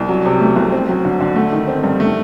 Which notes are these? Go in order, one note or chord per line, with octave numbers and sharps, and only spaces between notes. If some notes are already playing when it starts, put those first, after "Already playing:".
Already playing: C2
F#3
C3
A3
C2
C4
F#3
D3
D3
A3
D#3
C4
G2
A3